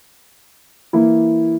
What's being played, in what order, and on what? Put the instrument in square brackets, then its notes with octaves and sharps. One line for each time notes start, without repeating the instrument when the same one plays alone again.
[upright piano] E3 A#3 E4